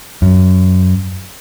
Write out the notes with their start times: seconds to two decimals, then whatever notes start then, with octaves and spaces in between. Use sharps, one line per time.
0.22 F#2